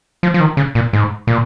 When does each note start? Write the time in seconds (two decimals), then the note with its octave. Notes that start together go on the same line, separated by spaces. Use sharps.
0.23 F3
0.34 F3
0.40 D#3
0.57 C#3
0.75 A#2
0.93 G#2
1.27 A#2